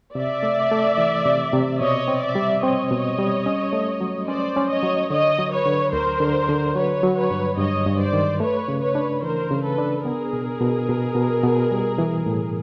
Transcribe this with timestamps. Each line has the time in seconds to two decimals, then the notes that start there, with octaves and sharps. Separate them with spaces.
0.15 C3 D5 E5
0.43 A3
0.71 A3
0.98 E3
1.25 C3
1.53 C3
1.81 B2 C#5 D#5
2.08 C4
2.22 D5 E5
2.35 G3
2.63 C4 C#5 D#5
2.91 B2
3.19 G3
3.46 C#4
3.73 A3
4.01 F#3
4.28 C#4 C5 D5
4.56 C#4
4.69 C#5 D#5
4.83 F#3
5.10 D3 C#5 D#5
5.39 F#3
5.52 B4 C#5
5.66 D3
5.93 D2 A#4 C5
6.20 D3
6.49 D3
6.76 F#3 B4 C#5
7.03 F#3
7.17 B4 C#5
7.31 G2
7.58 G2 C#5 D#5
7.86 G2
8.00 C5 D5
8.13 D#3
8.40 A3 B4 C#5
8.68 C#3
8.82 B4 C#5
8.95 D4
9.23 E3 A#4 C5
9.51 C#3
9.64 A4 B4
9.78 D4
10.05 B3 G#4 A#4
10.33 B2
10.61 B2
10.89 B2
11.15 B2
11.43 B2
11.71 G3
11.98 E3
12.26 A2